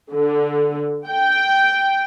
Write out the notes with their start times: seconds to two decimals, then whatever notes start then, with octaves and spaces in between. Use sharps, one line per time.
0.13 D3
1.07 G5